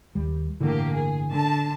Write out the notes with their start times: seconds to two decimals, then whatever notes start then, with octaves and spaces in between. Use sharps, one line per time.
0.15 D#2 G3
0.60 G1 A2 D3 E3 A#3 G4
0.93 G#4
1.29 D3 A5